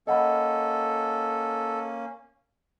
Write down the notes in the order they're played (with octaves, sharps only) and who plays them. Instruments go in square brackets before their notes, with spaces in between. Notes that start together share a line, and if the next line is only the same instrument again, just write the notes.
[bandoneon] A#3 C#4 [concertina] A4 [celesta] D#5 F#5 B5